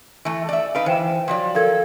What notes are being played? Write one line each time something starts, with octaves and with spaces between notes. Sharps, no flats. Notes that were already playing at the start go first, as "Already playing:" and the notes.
E3 A3
D5 E5
D#4 B4 F5 D7
E3 C5 G5 E7
F3 F#3 D5
A4 A#4 F5 G#6